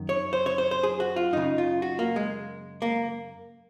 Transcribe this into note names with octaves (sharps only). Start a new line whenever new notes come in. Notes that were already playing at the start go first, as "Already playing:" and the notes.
Already playing: F#2 D#3
C#5
C5
C#5
C5
C5
G#4
F#4
F4
F#2 C#3 D#4
F4
F#4
A#3
G#3
A#3